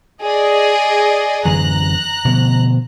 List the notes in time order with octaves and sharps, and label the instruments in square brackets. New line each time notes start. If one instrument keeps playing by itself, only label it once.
[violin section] G#4 D5 D#5
[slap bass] F#2 D3 E3 [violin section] A#5 F#6
[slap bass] B2 D3 F3